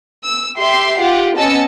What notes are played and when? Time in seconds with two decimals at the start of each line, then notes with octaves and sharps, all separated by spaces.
0.24 E6
0.57 G4 E5 C6 C7
1.01 F4 G4 F#5
1.36 B3 C#4 D#5 A5 E6 C#7